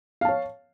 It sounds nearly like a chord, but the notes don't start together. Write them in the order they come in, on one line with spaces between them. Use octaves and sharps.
F5 A5 C#5